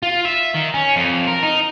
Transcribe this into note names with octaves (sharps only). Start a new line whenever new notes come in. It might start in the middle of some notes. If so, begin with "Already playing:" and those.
F4
E5
D#3
C#4
F2
A#4
D#4